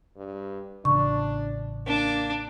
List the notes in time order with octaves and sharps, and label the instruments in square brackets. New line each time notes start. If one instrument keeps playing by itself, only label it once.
[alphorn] G2
[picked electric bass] A1 C#3 [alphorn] D4 [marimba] C#6
[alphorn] A#3 [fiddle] D4